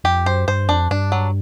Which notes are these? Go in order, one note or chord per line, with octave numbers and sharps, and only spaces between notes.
F2 G4
F#2 C5
G2 C5
F2 D4
G2 D4
F#3